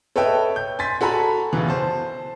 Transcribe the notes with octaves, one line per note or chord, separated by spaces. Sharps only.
A4 B4 C#5 D#5 E5 G5
G6
G#5 C6 A6 B6
F#4 A4 G#5 A#5 B5
C#2 B2 E3
C5 A5